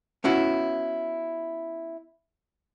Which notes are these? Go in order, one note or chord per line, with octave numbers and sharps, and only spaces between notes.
B3 C#4 E4 F#4